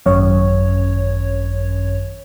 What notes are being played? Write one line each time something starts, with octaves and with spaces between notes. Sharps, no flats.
G#1 F#2 C#5